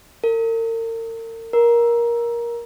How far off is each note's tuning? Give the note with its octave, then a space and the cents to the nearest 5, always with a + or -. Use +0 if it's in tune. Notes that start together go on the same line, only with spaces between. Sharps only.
A#4 -40
A#4 +15